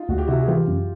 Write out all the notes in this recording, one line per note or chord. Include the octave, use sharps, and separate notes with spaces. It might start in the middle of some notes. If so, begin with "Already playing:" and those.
Already playing: D#4 F4
D2 F#4
G4
C3 E4 F#4
G#4
E3 F4 G4
F#2